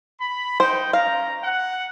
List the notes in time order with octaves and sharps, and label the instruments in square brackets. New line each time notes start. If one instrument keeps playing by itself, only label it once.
[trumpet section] B5
[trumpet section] D#4 G5 [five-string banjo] C5
[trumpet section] C#4 A#5 [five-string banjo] F5
[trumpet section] F#5